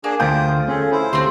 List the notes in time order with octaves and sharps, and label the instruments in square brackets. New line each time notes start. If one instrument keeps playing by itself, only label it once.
[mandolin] A#3 [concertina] D4 G#4
[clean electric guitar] D2 A3 G5 [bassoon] F4 [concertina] C5 D#6 [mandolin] G6
[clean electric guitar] C#4 A4 [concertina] G#4
[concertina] E4 C5
[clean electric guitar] D2 [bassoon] C3 [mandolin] C4 C6